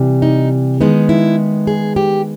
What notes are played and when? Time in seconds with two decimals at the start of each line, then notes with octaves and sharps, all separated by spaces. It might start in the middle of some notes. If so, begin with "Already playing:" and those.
Already playing: C3 E3 G3
0.22 D#4
0.81 D#3 G#3 B3 D#4
1.09 E4
1.67 G#4
1.96 G4